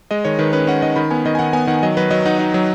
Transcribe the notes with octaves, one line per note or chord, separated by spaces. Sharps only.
G#3 D#5
D#3 C#5
D#3 B4
C#4 B4
C#4 F#5
D#3 D#5
D#3 B5
B3 G#5
D#3 D#5
G#5
D#3 F#5
B3 G#5
D#3 F#5
F#3 D#5
F#3 B4
F#3 D#5
D#4 F#5
D#4
F#3